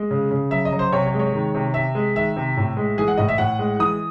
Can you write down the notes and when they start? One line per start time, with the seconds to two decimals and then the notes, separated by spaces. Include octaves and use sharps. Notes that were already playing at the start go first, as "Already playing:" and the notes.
Already playing: G#3
0.11 C#3
0.31 C#3
0.51 F#3 E5
0.65 D#5
0.72 F#3
0.79 C5
0.92 C3 C#5
1.06 C#5
1.14 G#3
1.19 C#5
1.33 D#3
1.55 C3
1.74 C3 E5
1.95 G#3
2.16 D#3 E5
2.36 C3
2.57 A2
2.77 G#3
2.98 E3 G#4
3.08 F#5
3.17 A2 D#5
3.28 E5
3.38 A2 F#5
3.59 G#3
3.80 E3 D#6